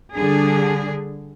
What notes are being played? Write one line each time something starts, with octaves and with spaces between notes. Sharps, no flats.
D3 G3 D4 G#4